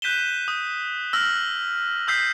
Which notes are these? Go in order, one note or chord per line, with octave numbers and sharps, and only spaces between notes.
F#6 G6 B6 D#7 E7 G7
D#6
E6 F6 A#6 F#7
D#6 E6 G6 B6 C7